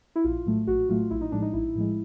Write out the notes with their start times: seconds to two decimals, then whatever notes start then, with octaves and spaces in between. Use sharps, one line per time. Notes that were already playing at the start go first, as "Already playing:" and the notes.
0.16 E4
0.24 A#1 F4
0.46 A2 F#3 A3
0.67 A#1 F#4
0.89 A2 F#3 A3 F4
1.11 A#1 E4
1.21 D#4
1.32 A2 F3 G#3 D4
1.42 D#4
1.53 A#1 E4
1.75 A2 F3 G#3